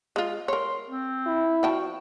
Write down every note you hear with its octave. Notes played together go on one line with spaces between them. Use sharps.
G#3 F4
A#4 C#5 C6
C4
E4
F3 F#4 G5 A5